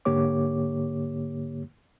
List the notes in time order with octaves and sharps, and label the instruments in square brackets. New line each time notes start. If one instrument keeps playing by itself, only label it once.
[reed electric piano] G#2 D3 A#3 G4 C#5 D6